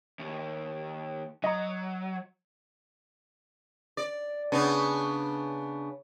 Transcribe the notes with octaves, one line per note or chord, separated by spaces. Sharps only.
D#2
F#3 D#5 A#5
D5
C#3 B3 D4